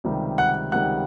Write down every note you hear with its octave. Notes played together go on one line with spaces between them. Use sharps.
C#2 C3 D#3 G3
F#5 F#6
C#2 C3 D#3 G3 F#5 F#6